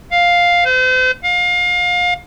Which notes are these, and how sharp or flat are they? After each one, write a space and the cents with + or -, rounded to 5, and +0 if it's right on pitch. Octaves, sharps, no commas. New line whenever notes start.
F5 +5
C5 -40
F5 +30